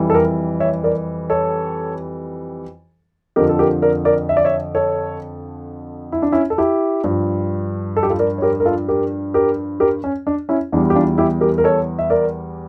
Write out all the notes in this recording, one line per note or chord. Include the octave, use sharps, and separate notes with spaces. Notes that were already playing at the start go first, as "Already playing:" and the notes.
Already playing: F2 E3 G3
A4
G4 A#4
C#5 E5
A#4 D5
A4 C#5
F2 D3 F3 G4 A#4
A4
G4 A#4
A#4 D5
A#4 D5
E5
D5
C#5 E5
A4 C#5
E4
D4
C#4 E4
A4
E4 G4
G2 F3
A4
G4
F4 A4
A#4 D5
C#5
G4 A#4
A#4
F4 A4
G4 A#4
G4 A#4
G4 A#4
C#4
D4
C#4 E4
E2 E3 G3 D4
G4
D4 F4
E4 G4
G4 A#4
A#4
A4 C#5
E5
A#4 D5